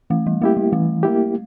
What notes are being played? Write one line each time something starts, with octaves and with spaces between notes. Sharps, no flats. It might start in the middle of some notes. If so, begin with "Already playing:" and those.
E3 A3
G3
A3 A#3 E4 G4
G3
E3 A3
A#3 E4 G4